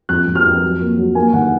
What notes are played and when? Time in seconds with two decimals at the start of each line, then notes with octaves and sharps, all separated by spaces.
0.09 F2 F#6
0.27 F2
0.35 F6
0.45 F2
0.63 F#3
0.81 A#3
0.97 F#3
1.15 A#3 G#5
1.33 D#3 F#5